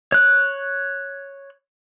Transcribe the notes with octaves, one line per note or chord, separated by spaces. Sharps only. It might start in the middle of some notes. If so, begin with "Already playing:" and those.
C#5 F#6